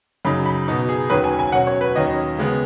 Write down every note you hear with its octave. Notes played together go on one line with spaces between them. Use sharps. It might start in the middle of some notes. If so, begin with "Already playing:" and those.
F#2 C#3 F#3 D#4 B5
B5
B2 B3 D#4
G#4
D#2 D#3 F#3 C#4 B4
G#5
G#5
B2 F#3 C#4 F#5
C#5
B4
D#2 D#3 F#3 C#4 D#5
C#3 G#3 B3